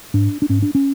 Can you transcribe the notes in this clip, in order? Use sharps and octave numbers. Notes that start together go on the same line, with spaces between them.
G#2 D4
D4
G#2 C#4
D4
C#4